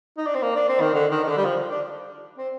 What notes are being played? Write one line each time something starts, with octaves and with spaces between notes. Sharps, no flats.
D#4
D4
C4
A#3
D4
C4
D#3
D3
D#3
D#3
D3
G3
F3
D4
C4